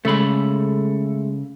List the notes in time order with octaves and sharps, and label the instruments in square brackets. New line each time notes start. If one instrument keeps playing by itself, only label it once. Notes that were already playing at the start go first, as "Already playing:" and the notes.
[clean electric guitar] C#3 A4 B5 [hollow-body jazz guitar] G#3 A3